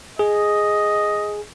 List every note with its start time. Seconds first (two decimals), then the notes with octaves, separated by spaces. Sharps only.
0.19 G#4 D#5